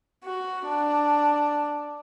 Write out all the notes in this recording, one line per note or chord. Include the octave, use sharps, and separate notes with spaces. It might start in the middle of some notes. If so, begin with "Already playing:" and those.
F#4
D4